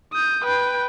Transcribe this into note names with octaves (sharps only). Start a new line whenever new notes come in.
D#6 G6
B4 G5